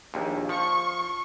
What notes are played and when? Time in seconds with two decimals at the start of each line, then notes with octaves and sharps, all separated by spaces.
0.14 A#1 D#2
0.49 F3 C#6